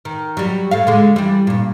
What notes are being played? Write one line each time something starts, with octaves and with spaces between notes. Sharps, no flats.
D#3
F#3 G3
A2 A4 F5
D3 G#3
E3 G3
G2 A#2